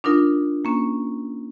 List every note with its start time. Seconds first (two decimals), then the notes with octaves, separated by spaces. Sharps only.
0.04 D4 D#4 F4 A#4
0.65 A#3 C#4